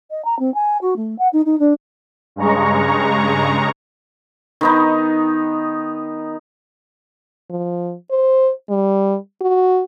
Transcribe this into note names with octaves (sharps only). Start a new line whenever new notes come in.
D#5
A#5
C4
G#5
F#4
A3
F#5
D#4
D#4
D4
G2 C#3 G#3 A#5 C#6
D#3 B3 D#4
F3
C5
G3
F#4